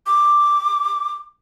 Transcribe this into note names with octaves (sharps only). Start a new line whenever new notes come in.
D6